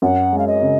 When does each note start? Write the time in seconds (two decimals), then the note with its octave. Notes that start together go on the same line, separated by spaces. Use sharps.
0.02 F#2 F#5
0.33 G#3
0.38 F5
0.47 D#5
0.62 C#3